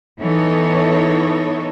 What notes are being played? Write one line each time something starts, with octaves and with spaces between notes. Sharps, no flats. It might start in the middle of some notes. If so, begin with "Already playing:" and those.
E3 B3 D#4 A4 C#5